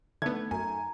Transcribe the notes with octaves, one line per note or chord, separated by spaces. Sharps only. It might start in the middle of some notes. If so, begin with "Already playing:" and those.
D3 A3 B3 D#4 G#6
F#2 G#5 A#5